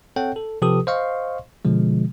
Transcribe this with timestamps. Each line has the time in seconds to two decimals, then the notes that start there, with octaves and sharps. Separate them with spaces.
0.16 C4 A4 C#5 F#5 G5
0.36 A4
0.62 C3 F3 G4 A4 B4 D#6
0.87 C5 D#5 F5 C6 C#6
1.65 B2 D3 F3 G#3